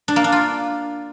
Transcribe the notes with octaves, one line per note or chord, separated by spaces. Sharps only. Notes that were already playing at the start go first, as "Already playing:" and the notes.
D4
A#3
D4
F4